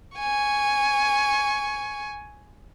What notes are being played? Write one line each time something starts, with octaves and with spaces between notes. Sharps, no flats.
G#5 C#6